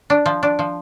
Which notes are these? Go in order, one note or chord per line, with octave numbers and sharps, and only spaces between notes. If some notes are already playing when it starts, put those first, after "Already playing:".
D4
F3
D4
F3